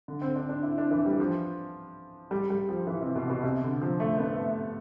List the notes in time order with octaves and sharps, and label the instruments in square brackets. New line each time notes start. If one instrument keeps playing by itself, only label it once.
[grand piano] D3
C4
D4
D4
E4
D4
E3
G3
F3
G3
G3
F3
E3
C3
B2
B2
C3
D3
F3
A3
B3
A3